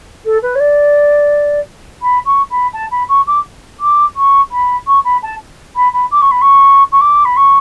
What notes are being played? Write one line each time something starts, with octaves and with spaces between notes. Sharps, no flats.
A4
B4
C#5
D5
B5
C#6
B5
A5
B5
C#6
D6
D6
C#6
B5
C#6
B5
A5
B5
B5
D6
C#6
B5
C#6
C#6
D6
B5
C#6